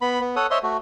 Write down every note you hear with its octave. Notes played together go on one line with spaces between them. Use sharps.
B3 B5
B3
A4 C#5 F#5 D#6
C5 C#5 D#5 E5 C6
A3 F#4